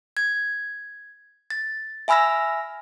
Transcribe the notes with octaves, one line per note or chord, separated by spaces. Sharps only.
G#6
A6
E5 G#5 B5 E6 F6 A#6